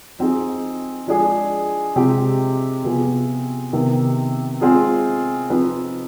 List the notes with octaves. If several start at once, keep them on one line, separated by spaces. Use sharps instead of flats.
F3 C4 D#4 G#4
F3 G#3 D4 G#4
C3 F3 G#3 C4 G4
C3 F3 B3 F4 G#4
C3 D#3 B3 D#4
G#3 C4 F4 G#4
F3 C4 D#4 B4